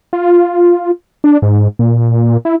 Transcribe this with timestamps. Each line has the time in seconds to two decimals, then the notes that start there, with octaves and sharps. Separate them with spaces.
0.13 F4
1.24 D4
1.42 G#2
1.79 A#2
2.45 E4